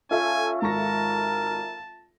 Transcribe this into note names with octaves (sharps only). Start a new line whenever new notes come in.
C#4 F4 A4 E5 G#5
G#1 A#4 A5 C#6 A#6